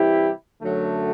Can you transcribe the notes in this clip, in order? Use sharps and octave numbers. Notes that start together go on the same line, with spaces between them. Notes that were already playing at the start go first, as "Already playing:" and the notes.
Already playing: C3 E3 G3 E4 G4
F#2 D3 F#3 A3